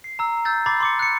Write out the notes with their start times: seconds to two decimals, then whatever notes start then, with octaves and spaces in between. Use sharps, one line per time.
0.04 C7
0.19 A#5 E6
0.45 E6 G6 A6
0.66 B5 D6 A6 C7
0.80 C6 D6 C#7
0.99 F#6 C#7